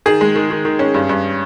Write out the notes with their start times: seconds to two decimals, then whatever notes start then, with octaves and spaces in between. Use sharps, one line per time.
0.06 D#3 G#4
0.21 G#3
0.36 D#3
0.51 D#3
0.65 D#3
0.79 C#4
0.94 G2
1.09 G2